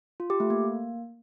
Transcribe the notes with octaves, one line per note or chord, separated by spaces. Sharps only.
F4
G4
A3
A#3